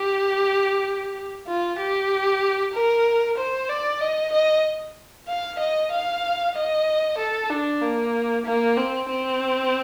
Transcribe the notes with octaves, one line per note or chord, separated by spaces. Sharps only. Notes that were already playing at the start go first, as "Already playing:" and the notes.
Already playing: G4
F4
G4
A#4
C5
D5
D#5
D#5
F5
D#5
F5
D#5
A4
D4
A#3
A#3
C4
C4